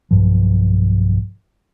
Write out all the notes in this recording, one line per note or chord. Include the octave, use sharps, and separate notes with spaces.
B1 G2 F3